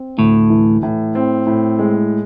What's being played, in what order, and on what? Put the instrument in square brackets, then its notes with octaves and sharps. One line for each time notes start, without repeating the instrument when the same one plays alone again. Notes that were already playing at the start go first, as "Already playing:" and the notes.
Already playing: [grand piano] C4
[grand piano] D2 [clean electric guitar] A2
[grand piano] E3
A2
C4
A2
G#3